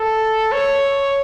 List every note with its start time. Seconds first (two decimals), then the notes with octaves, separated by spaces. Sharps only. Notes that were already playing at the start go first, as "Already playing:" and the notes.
Already playing: A4
0.52 C#5